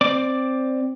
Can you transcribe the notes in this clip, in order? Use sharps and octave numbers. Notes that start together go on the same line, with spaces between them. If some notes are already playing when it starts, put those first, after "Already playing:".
C4 D5 D6